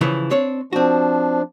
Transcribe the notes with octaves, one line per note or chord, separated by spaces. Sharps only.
C#3 E3 F3
C4 D4 C#5
F3 C4 D4 F#4